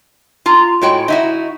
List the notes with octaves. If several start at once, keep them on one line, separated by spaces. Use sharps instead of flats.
F4 A#5
A2 G#3 F#4 C#5 G5
D#4 E4 F#4